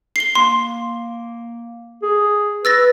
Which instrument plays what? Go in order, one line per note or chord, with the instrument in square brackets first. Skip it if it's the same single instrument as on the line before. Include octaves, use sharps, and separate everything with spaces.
[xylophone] C7 G7
[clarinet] A#3 [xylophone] C6
[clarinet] G#4
[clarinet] B4 [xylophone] E6 A6 A#6